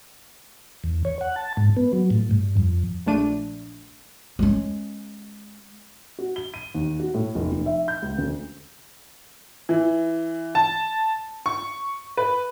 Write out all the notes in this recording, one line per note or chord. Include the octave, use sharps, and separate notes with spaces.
E2
C#5
F#5
A5
G#2
B3
F#3
A2
G2
F2
A#1 A3 D4 D#7
G#3 C#4
F#4
G7
D#7
D#2
F#4
A2
F1
F1
E5
G6
C#2
D2
E3
A5
C#6
B4